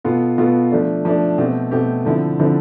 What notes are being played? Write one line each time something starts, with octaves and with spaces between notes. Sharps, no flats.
B2 B3 F4 A4
B2 B3 F4 A4
F3 A3 D4
F3 A3 D4
B2 A3 C4 G4
B2 A3 C4 G4
D3 F3 C4 E4
D3 F3 C4 E4